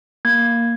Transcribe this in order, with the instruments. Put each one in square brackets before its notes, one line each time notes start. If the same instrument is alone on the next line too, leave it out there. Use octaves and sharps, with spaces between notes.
[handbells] A#3 G#6